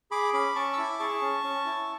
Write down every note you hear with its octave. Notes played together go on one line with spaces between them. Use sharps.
G#4 B5 D6
C#4 B5 D6
C#4 A5 C#6
E6
E4 B5 D6
G#4 A5 C#6
C#4
C#4
E4